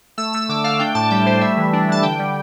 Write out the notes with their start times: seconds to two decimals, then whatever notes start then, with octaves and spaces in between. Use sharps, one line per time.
0.18 A3 E6
0.33 A3 E6
0.49 D3 D6
0.64 A3 F5
0.79 D4 G5
0.95 A2 A5
1.10 G3 G5
1.26 G3 C5
1.41 A3 E5
1.57 E3
1.73 D4
1.88 E3 A5
2.03 D3 G5
2.19 G3